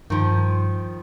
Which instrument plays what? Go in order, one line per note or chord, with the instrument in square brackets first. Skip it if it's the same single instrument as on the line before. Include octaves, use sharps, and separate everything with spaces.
[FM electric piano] G2 [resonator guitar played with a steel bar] D#3 F3